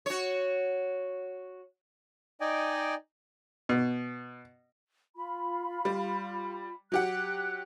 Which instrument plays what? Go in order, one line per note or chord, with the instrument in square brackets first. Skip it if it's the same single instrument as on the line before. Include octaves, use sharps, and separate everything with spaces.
[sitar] F#4 C#5
[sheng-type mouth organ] D#4 D5 D#5 G5 G#5
[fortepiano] B2
[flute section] F4 B5
[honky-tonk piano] G3
[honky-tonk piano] F#3 G4 F#5 [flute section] F#6